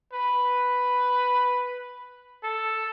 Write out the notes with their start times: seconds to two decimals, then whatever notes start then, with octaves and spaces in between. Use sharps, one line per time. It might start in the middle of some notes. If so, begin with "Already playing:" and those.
0.13 B4
2.43 A4